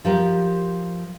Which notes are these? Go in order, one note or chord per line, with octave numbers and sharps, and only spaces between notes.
F3 G4 A#4